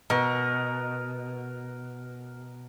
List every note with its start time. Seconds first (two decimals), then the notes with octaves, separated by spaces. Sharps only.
0.10 B2 A#4